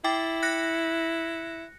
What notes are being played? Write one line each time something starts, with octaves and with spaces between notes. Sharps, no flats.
E4 G5 D6 A6
F#6 A#6 C#7